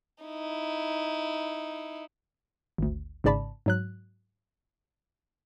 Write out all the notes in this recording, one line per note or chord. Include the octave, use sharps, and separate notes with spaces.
D#4 E4
G#1 D2
G#1 G#2 C#3 D5 A5 B5
G#2 F#3 F#6